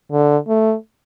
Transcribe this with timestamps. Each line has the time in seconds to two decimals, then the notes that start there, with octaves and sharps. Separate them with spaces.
0.12 D3
0.48 A3